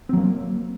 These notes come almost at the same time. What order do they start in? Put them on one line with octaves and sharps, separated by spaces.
C4 F#3 A#3